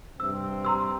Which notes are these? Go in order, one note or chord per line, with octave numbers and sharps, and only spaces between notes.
G2 C3 C4 E6
A#5 C6 E6